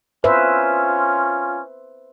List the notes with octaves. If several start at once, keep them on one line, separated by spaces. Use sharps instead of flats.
C#4 F4 B4 C5 E5